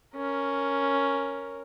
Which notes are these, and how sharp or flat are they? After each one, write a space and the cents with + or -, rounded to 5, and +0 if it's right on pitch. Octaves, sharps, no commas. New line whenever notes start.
C#4 +0 A#4 +0